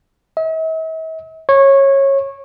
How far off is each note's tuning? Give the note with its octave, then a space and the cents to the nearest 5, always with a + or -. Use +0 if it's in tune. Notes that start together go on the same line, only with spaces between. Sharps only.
E5 -45
C#5 -20